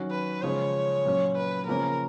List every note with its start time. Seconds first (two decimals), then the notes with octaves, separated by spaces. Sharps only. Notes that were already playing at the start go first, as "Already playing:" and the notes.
Already playing: D#3 F#3 C#4 F#4
0.11 B4
0.42 C#3 F3 G#3 C#4 C#5
1.05 A#2 F#3 C#4
1.36 B4
1.67 C#3 F3 A#3 C#4 A#4